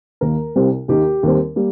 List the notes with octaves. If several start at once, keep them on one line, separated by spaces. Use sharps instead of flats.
D#2 D#3 A#3 A#4
C2 C3 G3 C4
D#2 D#3 A#3 G4
D#2 D#3 G3 C4
G3 A#3